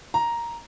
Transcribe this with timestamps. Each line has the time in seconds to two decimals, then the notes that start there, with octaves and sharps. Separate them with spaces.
0.14 A#5